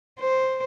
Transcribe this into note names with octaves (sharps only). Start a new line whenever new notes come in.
C5